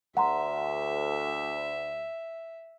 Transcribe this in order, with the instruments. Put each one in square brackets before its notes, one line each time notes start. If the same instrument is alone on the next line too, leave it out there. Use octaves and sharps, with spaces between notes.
[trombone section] D2 [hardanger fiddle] E5 [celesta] F#5 A#5 C6